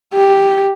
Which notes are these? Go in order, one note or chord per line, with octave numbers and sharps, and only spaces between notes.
G4